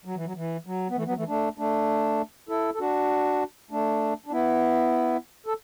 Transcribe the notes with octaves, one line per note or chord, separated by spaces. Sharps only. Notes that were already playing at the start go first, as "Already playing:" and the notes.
F#3
E3
F#3
E3
F#3
B3
E3 A3
F#3 B3
E3 A3
A3 D4
A3 D4
E4 A4
A4
D4 F#4
A3 D4
D4
B3 E4
A4